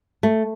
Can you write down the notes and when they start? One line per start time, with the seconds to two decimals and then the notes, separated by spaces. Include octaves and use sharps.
0.23 A3